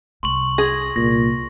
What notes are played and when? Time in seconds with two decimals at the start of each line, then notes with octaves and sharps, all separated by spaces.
0.23 C2 C6 C#6 F#7
0.58 G#4 A#6
0.96 C2 A#2 A#6